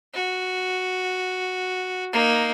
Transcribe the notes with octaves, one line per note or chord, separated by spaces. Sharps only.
F#4
A#3 D#4